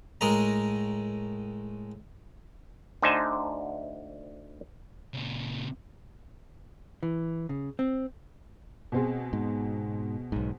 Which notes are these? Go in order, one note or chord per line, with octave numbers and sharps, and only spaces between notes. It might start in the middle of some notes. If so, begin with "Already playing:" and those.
A2 G#3 A#4 D#5 A#5
D2 D3 D#4 C5 G#5 A5
A#2 C#3
E3
C#3
C4
B2 C4 G#4
G#2
B1 G#2